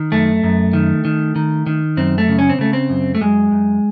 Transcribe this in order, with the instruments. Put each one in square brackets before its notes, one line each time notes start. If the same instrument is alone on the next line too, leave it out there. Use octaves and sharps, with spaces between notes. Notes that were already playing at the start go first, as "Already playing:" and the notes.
Already playing: [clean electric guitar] D#3
F#2 A3
F#2
D#3
D#3
D#3
D#3
F#2 C4
A3
C#3
C#4
C4
C#3 A3
C4
F#2
A3
F#2 G#3
F#2